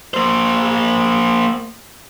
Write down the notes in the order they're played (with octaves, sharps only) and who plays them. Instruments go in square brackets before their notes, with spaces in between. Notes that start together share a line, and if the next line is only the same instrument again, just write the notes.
[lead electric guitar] A#3 C5